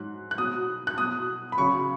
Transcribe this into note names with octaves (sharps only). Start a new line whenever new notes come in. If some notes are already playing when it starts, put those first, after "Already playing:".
Already playing: G#2 F#3 F#6
F#6
B2 F#3 D#6
F#6
B2 F#3 D#6
B5
F#2 C#3 F#3 C#6